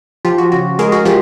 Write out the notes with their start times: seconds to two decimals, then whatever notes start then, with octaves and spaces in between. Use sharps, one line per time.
0.25 F3 F4 G4
0.38 F#4
0.52 C#3 F#4
0.79 G#3 G#4 A#4
0.92 F#4 G#4
1.05 F3 F4 G4